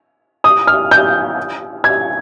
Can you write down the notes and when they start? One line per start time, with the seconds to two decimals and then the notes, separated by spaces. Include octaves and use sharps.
0.44 D#6
0.67 F6
0.91 G6
1.84 G#6